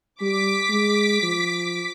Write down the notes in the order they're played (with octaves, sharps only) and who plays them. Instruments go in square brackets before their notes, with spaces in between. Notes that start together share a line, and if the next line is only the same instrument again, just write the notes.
[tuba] G3 [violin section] D6 B6
[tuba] G#3
F3